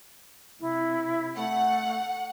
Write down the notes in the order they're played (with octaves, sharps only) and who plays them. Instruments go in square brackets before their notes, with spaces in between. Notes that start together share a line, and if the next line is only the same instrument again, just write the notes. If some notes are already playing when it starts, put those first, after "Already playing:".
[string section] C3 [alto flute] E4
[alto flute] A3 [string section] F#5